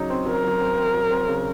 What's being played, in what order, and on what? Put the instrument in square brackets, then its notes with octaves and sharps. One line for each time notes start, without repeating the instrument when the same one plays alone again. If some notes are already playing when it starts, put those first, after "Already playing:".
Already playing: [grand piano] C#3 F#3 D#4
C4
[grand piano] F#3 [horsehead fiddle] A#4
[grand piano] F#3
C4
C4
F#3
C4
C#3